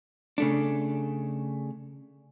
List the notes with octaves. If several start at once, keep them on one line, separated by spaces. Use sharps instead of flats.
C#3 A3 D4